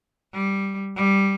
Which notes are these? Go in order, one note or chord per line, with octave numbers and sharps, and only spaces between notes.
G3
G3